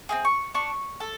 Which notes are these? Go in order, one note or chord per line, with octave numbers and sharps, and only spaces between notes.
C4 E4 G#4
C#6
D4 C#6
A4